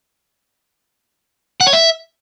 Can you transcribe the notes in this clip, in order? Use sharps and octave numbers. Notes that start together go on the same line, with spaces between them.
F#5
C#5
E5